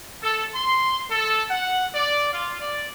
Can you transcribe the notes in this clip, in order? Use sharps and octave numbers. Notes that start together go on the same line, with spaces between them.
A4
C6
A4
F#5
D5
F4
D5